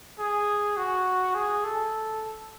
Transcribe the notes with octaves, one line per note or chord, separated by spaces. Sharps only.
G#4
F#4
G#4
A4